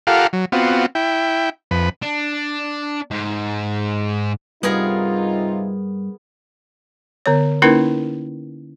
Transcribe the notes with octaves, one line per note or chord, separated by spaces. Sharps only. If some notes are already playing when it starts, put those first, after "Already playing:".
F4 G4 A4 A#4 F5 F#5
F#3
B3 C4 F4 F#4
E4 G5
F2 B4
D4
G#2
G2 C3 B3 D#4 F4 G#4 A#4
D3 B3 C#5
A#3 C#4 D#4 E4 A#4 B4